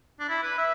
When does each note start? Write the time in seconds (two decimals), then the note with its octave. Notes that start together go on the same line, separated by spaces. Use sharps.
0.20 D4
0.29 E4
0.43 B4
0.58 E5